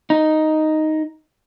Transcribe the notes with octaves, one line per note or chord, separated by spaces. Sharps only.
D#4